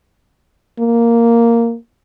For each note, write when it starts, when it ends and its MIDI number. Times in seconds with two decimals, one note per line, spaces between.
0.79 1.75 58